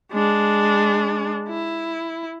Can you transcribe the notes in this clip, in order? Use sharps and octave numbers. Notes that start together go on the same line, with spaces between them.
G#3 D4
E4